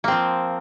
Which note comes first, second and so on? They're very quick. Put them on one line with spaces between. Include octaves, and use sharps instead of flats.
A#3 C4 F3